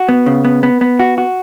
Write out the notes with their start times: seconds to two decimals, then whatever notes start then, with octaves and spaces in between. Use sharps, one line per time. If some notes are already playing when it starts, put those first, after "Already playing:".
Already playing: F#4
0.09 B3
0.26 C#3
0.45 B3
0.63 B3
0.81 B3
0.99 F#4
1.18 F#4